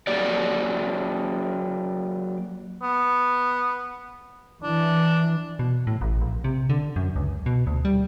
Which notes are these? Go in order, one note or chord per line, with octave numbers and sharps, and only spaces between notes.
F#3 A#3 G4 D5
B3
E3 D4
B2
A2
A1
A#1
C3
D3
F#2
C#2
B2
D2
G3